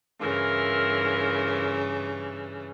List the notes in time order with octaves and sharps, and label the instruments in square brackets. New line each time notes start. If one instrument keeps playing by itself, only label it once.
[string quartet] G2 C#3 E3 [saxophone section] E4 F4 A#4